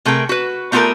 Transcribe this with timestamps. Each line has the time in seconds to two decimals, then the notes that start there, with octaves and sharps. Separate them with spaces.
0.05 C3 A3 G#4 A#4 G5
0.29 F#4 B4
0.72 A3 B3 F4 G4 A4 A#4